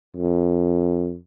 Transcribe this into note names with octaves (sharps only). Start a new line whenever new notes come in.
F2